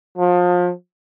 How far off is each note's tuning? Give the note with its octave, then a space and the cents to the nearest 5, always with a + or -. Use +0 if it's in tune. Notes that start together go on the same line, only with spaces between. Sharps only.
F3 +30